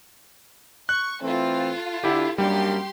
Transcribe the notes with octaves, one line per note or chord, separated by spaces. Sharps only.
C#6 F#6
E3 A3 C4 F4 A4
D3 E4 G4
F#2 G3 A#3 D4 G4 C6